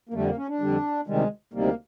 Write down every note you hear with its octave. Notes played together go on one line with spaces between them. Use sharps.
A#3
F2 D3 G3 A3
A#3
C#4
D4
F2 D3 G3
D2 C3 D#3 G3 G#3
D2 C3 D#3 G3 A#3